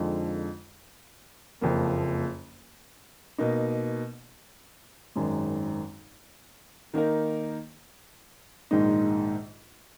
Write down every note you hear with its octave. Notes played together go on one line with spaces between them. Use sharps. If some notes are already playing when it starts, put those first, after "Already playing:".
Already playing: F2 D3 F3 G#3 D#4
F#1 F2 F3 A#3
B2 A#3 D#4
G#1 F#2 D#3 G#3
D#3 A#3 D#4 A#4
A#1 G#2 D#3 G#3 D#4